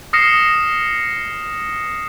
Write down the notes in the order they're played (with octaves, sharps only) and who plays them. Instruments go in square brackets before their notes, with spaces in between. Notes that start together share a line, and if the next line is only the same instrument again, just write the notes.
[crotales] D#6 F6 A#6 C7 C#7 E7